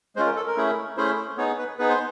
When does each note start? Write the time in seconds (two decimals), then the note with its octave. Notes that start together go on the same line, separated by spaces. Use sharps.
0.16 G#3 C#4 F4 C5
0.26 A#4
0.36 A4
0.47 A#4
0.57 A3 C#4 E4 G#4
0.97 A3 C#4 E4 G#4 C5
1.37 B3 D#4 G#4 C#5
1.58 B4
1.78 B3 D#4 G#4 B4
1.89 C5